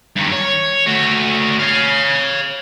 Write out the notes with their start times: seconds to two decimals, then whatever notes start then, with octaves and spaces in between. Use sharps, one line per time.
0.16 G2 D#3
0.32 C#5
0.87 A3 F#4
1.59 C#5 F5